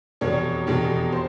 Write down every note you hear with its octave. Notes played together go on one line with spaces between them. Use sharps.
F1 E2 B2 C#5
F1 E2 B2
C5